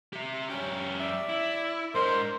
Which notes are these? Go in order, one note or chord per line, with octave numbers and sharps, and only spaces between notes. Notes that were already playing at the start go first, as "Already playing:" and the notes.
G4 E5
F#2 C#4 G4
D5 E5
E4
G#2 D4 A#4 C5 D#5